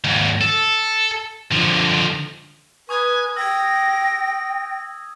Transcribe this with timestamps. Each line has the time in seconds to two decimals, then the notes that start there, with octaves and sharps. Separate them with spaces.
0.05 D#2 G#2
0.41 A4
1.52 D3 F3
2.89 B4 G#5 C#6 D#6 G#6
3.36 G5 E6 G#6 A#6